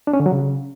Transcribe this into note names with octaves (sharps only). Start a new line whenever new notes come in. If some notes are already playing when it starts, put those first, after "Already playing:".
D4
C#4
D3
F#3
C#3